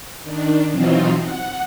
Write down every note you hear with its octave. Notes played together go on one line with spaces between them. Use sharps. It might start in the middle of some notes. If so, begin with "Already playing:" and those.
D#3 D4
B2 E3 F#3 C4 D#4 F4
F#5